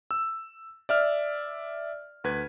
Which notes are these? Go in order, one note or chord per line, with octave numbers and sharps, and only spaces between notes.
E6
D5 E5 F6
D2 B4 G#6